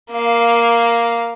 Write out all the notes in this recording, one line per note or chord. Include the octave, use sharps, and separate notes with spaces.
A#3 F5